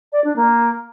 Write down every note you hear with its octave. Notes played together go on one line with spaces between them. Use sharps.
D5
D4
A#3